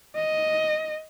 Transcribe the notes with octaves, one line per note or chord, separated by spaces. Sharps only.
D#5